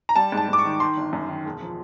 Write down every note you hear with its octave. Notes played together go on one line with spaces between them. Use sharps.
A#5
G3 A5
G#2
A5
G#2 D6
C#6
D#3
D#3 C6
G1
F#2
D#3
E1
F3